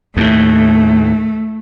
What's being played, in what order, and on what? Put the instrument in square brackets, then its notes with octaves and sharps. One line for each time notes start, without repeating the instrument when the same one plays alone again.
[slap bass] D#2 A2 [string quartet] A3